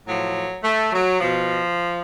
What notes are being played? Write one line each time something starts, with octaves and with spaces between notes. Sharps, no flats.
A2 F3 F#3
A3
F#3
B2 F3